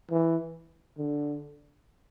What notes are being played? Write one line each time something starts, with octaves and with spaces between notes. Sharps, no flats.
E3
D3